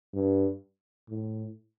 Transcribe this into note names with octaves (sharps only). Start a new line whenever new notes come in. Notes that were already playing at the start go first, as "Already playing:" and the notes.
G2
A2